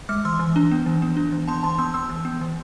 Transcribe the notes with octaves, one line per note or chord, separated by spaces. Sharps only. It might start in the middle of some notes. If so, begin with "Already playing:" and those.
G#3 D6 F6
E3 C6 E6
E3
D4
B3
E3
B3
D4
E3
B3 A5 C6
E3 A5 C6
B3 C6 E6
B3 C6 E6
E3
B3
E3